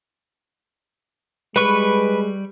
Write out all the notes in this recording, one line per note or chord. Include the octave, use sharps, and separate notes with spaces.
G3 G#3 B4 C#6